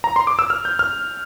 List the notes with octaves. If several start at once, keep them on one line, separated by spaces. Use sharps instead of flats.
A#5
C6
D6
E6
F6
G6
F6